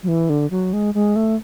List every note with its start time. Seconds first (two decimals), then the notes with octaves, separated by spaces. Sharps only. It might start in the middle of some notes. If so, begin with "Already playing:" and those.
0.03 F#3
0.08 E3
0.29 D3
0.51 F#3
0.73 G#3
0.94 G#3
1.16 A3